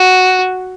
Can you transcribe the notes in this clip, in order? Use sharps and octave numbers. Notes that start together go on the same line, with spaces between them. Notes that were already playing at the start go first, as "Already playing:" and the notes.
Already playing: F#4